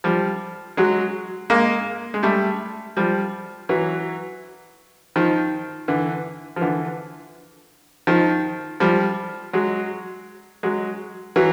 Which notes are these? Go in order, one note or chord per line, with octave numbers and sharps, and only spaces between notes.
F3 G3
F#3 G#3
G#3 A#3
G#3
G3 A3
F3 G3
E3 F#3
D#3 F3
D3 E3
F3
D3 E3
D#3 F3
F3 G3
F#3 G#3
F#3 G#3
E3 F#3